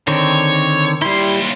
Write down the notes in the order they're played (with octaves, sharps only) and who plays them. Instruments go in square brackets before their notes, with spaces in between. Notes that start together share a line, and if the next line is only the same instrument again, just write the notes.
[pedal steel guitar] D3 D#3 C4 [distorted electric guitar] C#5
[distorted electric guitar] D#2 C6 [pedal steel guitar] G3 E4